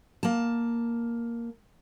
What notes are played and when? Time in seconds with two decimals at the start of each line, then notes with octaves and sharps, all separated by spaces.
0.23 A#3 A5